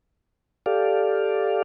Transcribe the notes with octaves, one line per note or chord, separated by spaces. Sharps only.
G4 A4 D5 F5